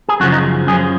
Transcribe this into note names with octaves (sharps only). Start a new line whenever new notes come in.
G#4
F#2 C#3 F3 F#4
D#4
F#2 F3 G#4